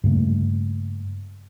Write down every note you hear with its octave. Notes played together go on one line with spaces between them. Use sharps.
G2 C#3 A3 A#3